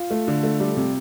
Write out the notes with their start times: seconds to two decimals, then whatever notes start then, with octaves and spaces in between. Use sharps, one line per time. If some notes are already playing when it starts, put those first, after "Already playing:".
Already playing: F4
0.11 A3
0.28 D3
0.44 A3
0.60 G3
0.77 C3